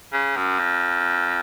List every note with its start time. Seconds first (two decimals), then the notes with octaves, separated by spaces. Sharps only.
0.13 C#3
0.36 F#2
0.59 F2